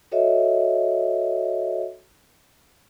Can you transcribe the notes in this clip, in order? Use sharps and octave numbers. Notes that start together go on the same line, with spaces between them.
F#4 A4 C#5 D#5 E5